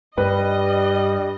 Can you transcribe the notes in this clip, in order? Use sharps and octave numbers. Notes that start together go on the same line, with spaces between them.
G2 G3 B4 D#5